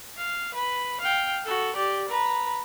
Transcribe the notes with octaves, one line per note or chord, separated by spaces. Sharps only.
F5
B4
F5 G5
F#4 A4
G4 D5
B4 A#5